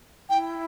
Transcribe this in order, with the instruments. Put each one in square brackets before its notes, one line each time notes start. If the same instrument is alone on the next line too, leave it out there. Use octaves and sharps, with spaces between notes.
[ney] E4 [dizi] G5